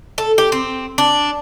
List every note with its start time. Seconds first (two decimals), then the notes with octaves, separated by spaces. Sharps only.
0.18 A4
0.38 G4
0.52 C4
0.98 D4